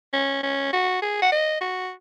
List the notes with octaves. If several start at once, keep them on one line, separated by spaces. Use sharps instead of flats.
C#4
C#4
F#4
G#4
F#5
D#5
F#4